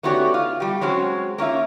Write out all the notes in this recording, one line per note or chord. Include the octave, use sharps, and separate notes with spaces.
A3 B3 C#4 F#4 G4 D5
F4
G3 G4
F#3 G#3 C4 C#4 F#4
A#3 C#4 F4 E5